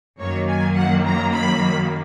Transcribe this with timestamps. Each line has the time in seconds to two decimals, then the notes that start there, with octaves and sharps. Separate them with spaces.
0.19 F#2 D#3 F#3 A#3 C#5
0.47 G#5
0.75 F#5
1.05 A#5
1.32 B5